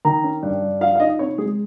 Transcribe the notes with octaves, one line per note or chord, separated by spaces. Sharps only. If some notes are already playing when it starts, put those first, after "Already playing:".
D#3 A#5
C#4
G2
G3
F3 F5
F5
D#4 D#5
C3 C#5
G#3 G#4